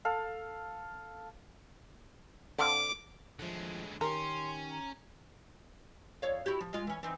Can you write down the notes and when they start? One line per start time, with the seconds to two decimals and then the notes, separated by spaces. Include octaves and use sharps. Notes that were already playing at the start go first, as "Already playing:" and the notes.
0.05 A4 F5
2.59 D3 C4 F5 D6
3.39 D#2 A2 D3 F3 G#3
4.01 D#3 C#4 G4 A#4 C6
4.72 A#5
6.22 F2 C#5 F5
6.46 E4 F#4 G4
6.61 F3
6.73 G#3 F4
6.87 E3 C#4
7.03 E3 C4 D#4